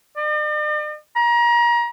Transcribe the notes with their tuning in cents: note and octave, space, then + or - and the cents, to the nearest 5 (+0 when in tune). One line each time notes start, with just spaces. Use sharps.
D5 +45
A#5 +30